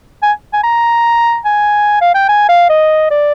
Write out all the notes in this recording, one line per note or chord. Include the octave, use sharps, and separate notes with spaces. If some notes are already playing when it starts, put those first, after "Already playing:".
G#5
G#5
A#5
G#5
F5
G5
G#5
F5
D#5
D5